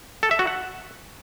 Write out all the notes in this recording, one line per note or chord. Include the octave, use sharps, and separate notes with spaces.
A4
E5
F#4
F#5